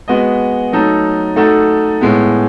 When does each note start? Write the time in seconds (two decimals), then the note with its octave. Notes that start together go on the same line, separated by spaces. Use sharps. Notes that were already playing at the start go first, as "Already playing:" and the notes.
0.08 G#3 B3 F#4 B4 D#5
0.72 F#3 A3 D#4 A4
1.36 A3 D#4 F#4 A4
2.01 A2 G#3 B3